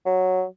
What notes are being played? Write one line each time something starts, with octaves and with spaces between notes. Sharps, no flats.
F#3